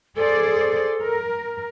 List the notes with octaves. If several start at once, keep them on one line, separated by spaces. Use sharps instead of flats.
G#4 A4 C5 D5
A#4